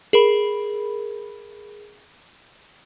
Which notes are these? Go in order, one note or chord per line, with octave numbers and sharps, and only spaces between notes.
G#4 A#4 B5